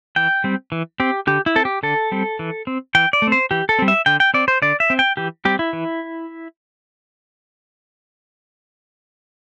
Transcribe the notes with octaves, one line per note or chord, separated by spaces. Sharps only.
E3 G5
G3 C4
E3
C4 G4
D3 G4
E4
C4 A4
G4
D3 A4
G3 C4
E3
C4
E3 G5
D5
A3
C4 C5
E3 G4
A4
G3 C4
E5
D3 G5
G5
C4 D5
C5
D3 D5
E5
C4
G5
E3 G4
G3 C4 G4
E4
E3